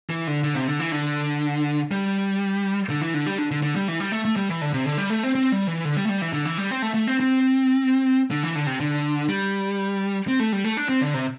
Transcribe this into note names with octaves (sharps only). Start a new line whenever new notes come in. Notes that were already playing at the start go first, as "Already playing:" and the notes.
E3
D3
D3
C3
D3
E3
D3
G3
D3
E3
D3
G3
D3
D3
D3
G3
E3
G3
A3
A3
G3
E3
D3
C3
D3
G3
A3
C4
C4
G3
E3
D3
G3
A3
G3
E3
D3
E3
G3
C4
A3
A3
C4
C4
D3
E3
D3
C3
D3
G3
C4
A3
G3
A3
D4
C4
D3
C3